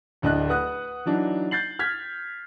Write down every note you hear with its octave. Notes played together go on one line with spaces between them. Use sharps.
D1 D2 D4 D#5 F#6
B4 F#5 D#6 F#6
E3 F#3 D4 D#4
G6 A6 C7 F#7
F6 G#6 B6